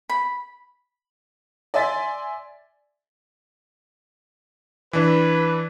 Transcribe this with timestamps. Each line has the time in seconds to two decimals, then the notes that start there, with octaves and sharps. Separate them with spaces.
0.10 B5
1.74 D5 E5 G#5 C6 A6 B6
4.93 E3 D4 B4